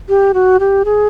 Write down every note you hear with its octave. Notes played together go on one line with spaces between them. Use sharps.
G4
F#4
G4
G#4